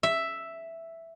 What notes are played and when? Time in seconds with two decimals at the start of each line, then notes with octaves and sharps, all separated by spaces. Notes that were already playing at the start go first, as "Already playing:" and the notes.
0.03 E5